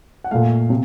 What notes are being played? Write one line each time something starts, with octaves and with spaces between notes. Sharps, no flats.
F#5
A#2 A3 F5
C3